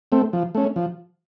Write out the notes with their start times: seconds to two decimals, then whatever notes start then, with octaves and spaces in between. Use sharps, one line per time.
0.12 A3 C4
0.33 F3
0.55 A3 C#4
0.76 F3